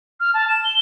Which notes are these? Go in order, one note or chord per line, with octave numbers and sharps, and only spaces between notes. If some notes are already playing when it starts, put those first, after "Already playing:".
F6
A5
E7
G7